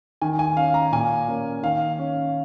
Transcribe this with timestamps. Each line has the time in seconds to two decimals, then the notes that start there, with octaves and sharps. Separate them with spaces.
0.22 D#3 G#5
0.39 G#5
0.57 C#4 F5
0.74 A#5
0.92 A#2 G#5
1.28 A#3 C#4
1.63 D#3 F5
1.98 C#4